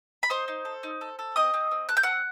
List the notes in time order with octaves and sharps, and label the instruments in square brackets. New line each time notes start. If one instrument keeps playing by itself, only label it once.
[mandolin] B5
D#4 C5 C6
D#4
A4
D#4
A4
A4
C4 D#5 D#6
C4
C4
A4 F#6
G6
C4 F#5 F#6